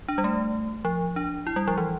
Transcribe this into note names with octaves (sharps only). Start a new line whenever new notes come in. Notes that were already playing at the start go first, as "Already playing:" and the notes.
D4
G3
A3
F3
D4
E4
G3
F3
E3